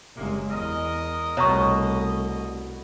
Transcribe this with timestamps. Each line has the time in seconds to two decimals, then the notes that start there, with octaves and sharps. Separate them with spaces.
0.17 F#1 C3 G#3 A#3
0.51 E2 G#4 A#4 D#5
1.37 C2 B2 A3 C#5 D#5 A#5 C#6